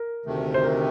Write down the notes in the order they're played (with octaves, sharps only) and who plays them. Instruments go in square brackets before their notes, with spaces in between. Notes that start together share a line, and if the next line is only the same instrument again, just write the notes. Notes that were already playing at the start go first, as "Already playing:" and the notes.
Already playing: [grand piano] A#4
[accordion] D2 C3 D#3 A3
[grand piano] C5
A#4